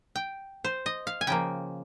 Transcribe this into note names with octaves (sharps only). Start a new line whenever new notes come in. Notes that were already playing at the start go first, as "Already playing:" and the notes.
G5
C5
D#5
F5
G#5
C#3 F3 A#3 G5